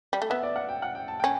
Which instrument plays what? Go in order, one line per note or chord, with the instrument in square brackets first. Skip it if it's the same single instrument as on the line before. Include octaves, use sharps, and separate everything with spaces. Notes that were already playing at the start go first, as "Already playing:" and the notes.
[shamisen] G3
A3
[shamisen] B3 [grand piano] E5
[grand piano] D5
F#5
G5
F#5
G5
A5
[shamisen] C#4 [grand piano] G5